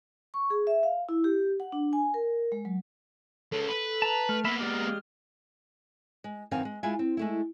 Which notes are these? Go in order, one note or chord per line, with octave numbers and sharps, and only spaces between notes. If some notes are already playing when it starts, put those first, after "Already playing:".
C#6
G#4
E5
F5
E4
G4
F#5
D4
G#5
A#4
G#3
F#3
G#3 C#4 A4
B4
A5 A#5
A3 F6
A#3 B3 E5 B5
G#3 G4 D5
G#3
F#2 D#3 B3 C4 F5 G#5
G#3
G#3 E4 F4 E5 G#5
C4
G#3 A3 E4